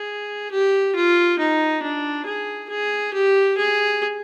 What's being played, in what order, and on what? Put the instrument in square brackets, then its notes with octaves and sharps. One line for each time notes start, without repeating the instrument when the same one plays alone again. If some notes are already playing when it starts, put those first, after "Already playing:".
Already playing: [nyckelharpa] G#4
G4
F4
D#4
D4
G#4
G#4
G4
G#4